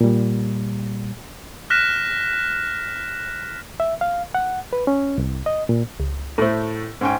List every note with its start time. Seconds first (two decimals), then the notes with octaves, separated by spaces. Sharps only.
0.01 A#2 G3
1.70 F6 F#6 A#6 B6 E7
3.80 E5
4.01 F5
4.35 F#5
4.73 B4
4.87 C#4
5.18 C2
5.46 D#5
5.69 A#2
6.00 C#2
6.38 A2 A3 A4 C5
7.01 G#2 C#4 G5